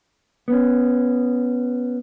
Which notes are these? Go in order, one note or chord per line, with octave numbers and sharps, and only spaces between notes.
B3 C#4